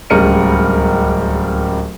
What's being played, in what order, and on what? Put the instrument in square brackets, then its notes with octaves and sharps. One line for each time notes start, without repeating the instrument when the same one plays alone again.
[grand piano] D1 C#2 G3 A#4 C#7 D#7